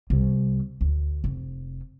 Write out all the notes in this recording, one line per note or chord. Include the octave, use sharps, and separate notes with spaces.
C2
D2
F1